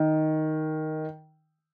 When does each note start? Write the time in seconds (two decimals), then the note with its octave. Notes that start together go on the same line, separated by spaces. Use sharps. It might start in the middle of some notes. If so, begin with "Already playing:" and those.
Already playing: D#3